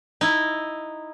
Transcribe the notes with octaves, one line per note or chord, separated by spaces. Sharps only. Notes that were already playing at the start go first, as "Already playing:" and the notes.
D#4 E4